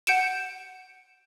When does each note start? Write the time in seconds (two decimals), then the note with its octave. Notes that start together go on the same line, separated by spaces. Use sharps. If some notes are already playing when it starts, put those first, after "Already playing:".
0.07 F#5 G6 C#7 D7 E7